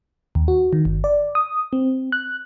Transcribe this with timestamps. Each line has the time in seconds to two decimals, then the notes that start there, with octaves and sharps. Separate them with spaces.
0.35 D#2
0.48 F#4
0.73 D#3
0.85 G1
1.04 D5
1.35 D#6
1.73 C4
2.12 F#6